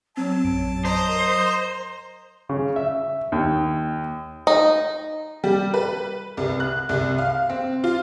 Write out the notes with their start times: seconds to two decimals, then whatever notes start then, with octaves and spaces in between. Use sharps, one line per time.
0.17 F#3 C4 A5
0.44 A#1 F#2 D7
0.85 C5 D#5 A#5 D#6
1.09 A#4
2.49 C#3
2.76 E5
3.32 D#2
4.47 D#4
5.44 G3
5.74 B4
6.37 C2
6.60 F#6
6.89 C2
7.18 F5
7.49 C4
7.84 F4